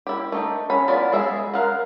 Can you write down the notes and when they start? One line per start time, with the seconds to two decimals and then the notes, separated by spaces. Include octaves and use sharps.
0.07 E4 G4
0.32 A3 D#4 G5
0.70 C#4 B5
0.88 F#3 B3 E4 F4 D5
1.12 G3 G#3 G#4 E5
1.54 A#4 F5 F#5